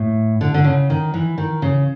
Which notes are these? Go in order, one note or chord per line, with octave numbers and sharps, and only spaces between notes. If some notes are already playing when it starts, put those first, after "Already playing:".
Already playing: A2
D3
D3
C#3
D#3
E3
D#3
C#3